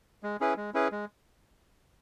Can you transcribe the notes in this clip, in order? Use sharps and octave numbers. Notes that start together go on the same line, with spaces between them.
G#3
C#4 E4 G#4 B4
G#3
C#4 E4 G#4 B4
G#3